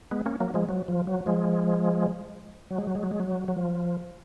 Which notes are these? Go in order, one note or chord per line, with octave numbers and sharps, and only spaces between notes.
G#3 B3
A#3 C#4
F#3 A#3
F3 G#3
F#3
F3
F#3
F3 G#3
F#3
G#3
F#3
G#3
F#3
G#3
F#3
F#3
F3